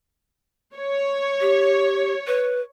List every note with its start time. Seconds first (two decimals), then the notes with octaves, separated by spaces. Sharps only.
0.75 C#5
1.41 G4
2.27 B4